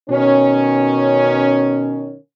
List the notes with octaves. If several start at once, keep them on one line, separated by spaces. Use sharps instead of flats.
B2 D#3 C#4